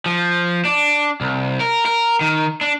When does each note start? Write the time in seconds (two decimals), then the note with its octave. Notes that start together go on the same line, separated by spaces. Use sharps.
0.06 F3
0.65 D4
1.21 C2
1.60 A#4
1.86 A#4
2.21 D#3
2.61 D4